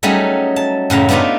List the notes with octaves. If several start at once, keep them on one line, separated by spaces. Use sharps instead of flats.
F#3 G3 A3 C#4 D#4 G#4
A5
F#2 A2 C#3 A#5
A3 B3 D4 D#4 F4